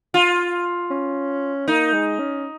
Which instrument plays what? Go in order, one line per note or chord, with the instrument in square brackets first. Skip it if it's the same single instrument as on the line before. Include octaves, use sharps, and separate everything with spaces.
[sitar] F4
[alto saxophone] C#4
[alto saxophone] A#3 [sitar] D#4
[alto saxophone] G#3
C#4